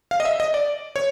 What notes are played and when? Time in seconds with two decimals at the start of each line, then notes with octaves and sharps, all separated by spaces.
0.11 F5
0.20 D#5
0.25 E5
0.40 D#5
0.54 D5
0.96 C#5